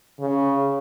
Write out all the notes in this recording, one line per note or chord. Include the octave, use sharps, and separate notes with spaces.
C#3